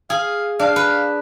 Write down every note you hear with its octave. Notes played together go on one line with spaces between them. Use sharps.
G#4 F5
D4 F5
B4